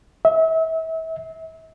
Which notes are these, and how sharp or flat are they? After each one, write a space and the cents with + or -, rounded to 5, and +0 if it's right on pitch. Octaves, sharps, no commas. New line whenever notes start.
E5 -35